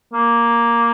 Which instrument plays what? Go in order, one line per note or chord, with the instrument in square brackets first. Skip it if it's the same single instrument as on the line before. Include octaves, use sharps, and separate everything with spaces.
[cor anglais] A#3